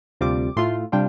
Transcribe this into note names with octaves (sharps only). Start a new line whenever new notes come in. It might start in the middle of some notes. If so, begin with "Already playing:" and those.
D2 C3 G3 C4 F4 D6
A2 A3 F4 C6
C3 G3 D4 F4 G5